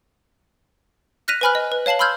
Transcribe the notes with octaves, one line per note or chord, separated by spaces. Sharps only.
F6 F#6 A#6 B6 D#7 F7
B4 C5 G#5 B5 F6 F#6
D#5
B4
C#5 F5 A5 C7 F#7
B5 C6 E6 F6 G6 G#6